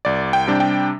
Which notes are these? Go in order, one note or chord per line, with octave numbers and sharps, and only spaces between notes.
C2 D5
G5
C3 G3 D4
G5